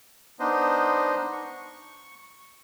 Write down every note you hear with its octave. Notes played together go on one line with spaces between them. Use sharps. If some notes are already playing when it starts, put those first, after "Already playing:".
B3 D4 D#4 C5 D#5
C#6